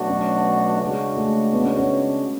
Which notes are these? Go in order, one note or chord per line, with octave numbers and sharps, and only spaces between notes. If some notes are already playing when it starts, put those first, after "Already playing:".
Already playing: B2 F#3 A3 D4 F#4
C#4
C#3 G#3 D4 F#4
A3
B3
C#4
C#4